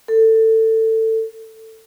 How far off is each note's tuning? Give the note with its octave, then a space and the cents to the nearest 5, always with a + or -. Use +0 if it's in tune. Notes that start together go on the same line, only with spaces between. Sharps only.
A4 +20